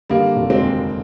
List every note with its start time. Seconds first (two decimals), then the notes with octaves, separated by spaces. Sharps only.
0.10 D3 G3 A#3
0.36 F1
0.50 G#3 C4
0.63 D#2